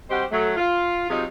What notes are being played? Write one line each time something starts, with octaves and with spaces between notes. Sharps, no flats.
G3 C4 F#4 G4 C5 D#5
F#3 A3
F4
C3 F#3 D#4 F4 G#4